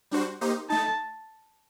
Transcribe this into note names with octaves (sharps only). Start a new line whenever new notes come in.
G3 D4 F#4 C5
A#3 D#4 G4 C5
A3 D#4 A5